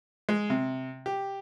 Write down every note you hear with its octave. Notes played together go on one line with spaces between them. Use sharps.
G#3
C3
G4